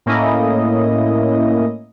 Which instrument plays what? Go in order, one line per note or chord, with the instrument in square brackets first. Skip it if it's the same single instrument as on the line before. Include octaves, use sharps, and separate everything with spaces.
[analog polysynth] A2 A#3 C#4 E4 D#5